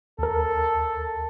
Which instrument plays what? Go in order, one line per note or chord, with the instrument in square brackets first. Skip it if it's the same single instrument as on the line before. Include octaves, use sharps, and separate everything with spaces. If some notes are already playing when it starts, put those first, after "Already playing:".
[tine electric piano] D#2 A#4 [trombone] A4